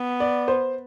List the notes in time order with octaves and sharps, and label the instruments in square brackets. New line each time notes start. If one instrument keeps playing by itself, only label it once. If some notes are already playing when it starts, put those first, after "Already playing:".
Already playing: [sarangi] B3
[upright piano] D5
C5